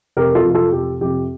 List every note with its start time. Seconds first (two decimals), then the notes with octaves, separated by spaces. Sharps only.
0.17 F1 G4 A#4
0.35 F4 A4
0.45 F2 C3
0.55 F4 A4
0.72 F1 G4
1.01 F2 C3 G4